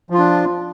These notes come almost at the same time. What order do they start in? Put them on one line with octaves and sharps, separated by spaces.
F3 F4 D4